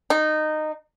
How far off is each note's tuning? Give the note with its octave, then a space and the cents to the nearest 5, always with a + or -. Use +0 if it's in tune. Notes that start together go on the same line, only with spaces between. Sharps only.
D#4 -15